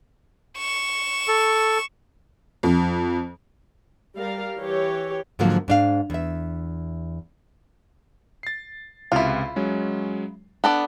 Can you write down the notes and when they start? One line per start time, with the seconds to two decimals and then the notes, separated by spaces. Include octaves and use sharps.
0.58 C#6 E7
1.28 A4
2.63 F2
4.18 G3 A#4 F5
4.58 E3 G4 C#5
5.39 G#2 D3 F3 F#3 A#3
5.68 G#2 D4 F5
6.10 E2 E5
8.43 A6 C7
9.12 C#2 C3 E4 F4
9.56 F#3 G#3 C#4
10.64 B3 D4 A4 D5